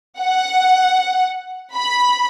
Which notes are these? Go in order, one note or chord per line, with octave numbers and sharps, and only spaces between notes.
F#5
B5